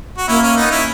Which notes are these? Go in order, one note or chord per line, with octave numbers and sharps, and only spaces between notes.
F#4
A#3 C#4 E4
C#4
B3 D#4
C#4 E4